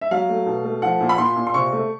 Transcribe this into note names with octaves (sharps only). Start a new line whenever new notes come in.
E5
F#3 F5
A3
B2
A3
F3 F#5
A#2
B5
A#2 C6
A#2
C6
C3 C#6
A3